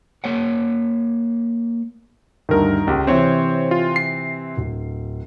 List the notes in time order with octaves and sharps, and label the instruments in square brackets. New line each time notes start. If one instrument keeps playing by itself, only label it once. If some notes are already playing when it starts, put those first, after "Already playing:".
[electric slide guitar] A#3 C#5 F#5
[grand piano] D2 G2 [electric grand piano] D#3 A#4
[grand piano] C#2 G4
[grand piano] C3 E3 C4 [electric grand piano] C5 C#5
[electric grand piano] F4
C7
[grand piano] D1